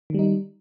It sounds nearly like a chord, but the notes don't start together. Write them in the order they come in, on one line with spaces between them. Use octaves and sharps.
D#3 G3 D#4